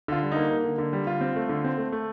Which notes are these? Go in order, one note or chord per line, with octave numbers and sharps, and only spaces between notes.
D3 F4
G3
A#3 D#4
A#3
D3
D3
G3
D3 F4
C4
A3
D3
C4
A3
A3